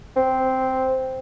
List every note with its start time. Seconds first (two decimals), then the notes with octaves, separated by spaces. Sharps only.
0.16 C4